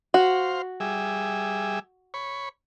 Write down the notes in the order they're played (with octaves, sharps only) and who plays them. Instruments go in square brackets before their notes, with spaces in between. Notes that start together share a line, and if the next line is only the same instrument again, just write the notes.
[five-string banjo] F#4 [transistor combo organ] C5 F5
[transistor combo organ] G3 G#4 E5
C#5 B5